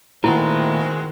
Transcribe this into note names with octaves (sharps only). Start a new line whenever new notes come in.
A#2 D#3 G#3 A3 B3 C4 E4 F#4